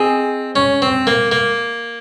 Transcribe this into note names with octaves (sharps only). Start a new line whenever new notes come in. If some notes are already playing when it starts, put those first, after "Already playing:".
Already playing: C4 G#4 D#5 G#5
C#4
C4
A#3
A#3